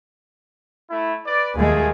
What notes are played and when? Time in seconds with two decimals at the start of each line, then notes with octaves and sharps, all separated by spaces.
0.90 A3 E4
1.26 B4 D5
1.56 D#2 G#3 A3 F4 G#4